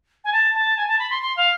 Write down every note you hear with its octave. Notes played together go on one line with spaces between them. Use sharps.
G#5
A5
A5
G#5
A5
B5
C6
C6
F5